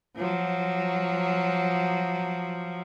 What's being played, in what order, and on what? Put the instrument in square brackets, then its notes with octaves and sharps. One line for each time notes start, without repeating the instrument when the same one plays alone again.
[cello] F3 F#3